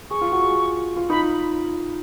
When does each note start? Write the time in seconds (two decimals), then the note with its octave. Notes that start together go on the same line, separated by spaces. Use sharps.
0.10 G#4 C#6
0.21 F4
0.32 F#4
0.43 G#4
0.96 F4
1.10 D#4 B5